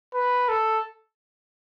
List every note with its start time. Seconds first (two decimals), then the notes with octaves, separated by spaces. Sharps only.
0.14 B4
0.49 A4